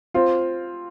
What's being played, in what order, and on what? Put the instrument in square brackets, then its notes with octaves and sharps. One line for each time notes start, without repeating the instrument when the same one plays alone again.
[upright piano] C4 F4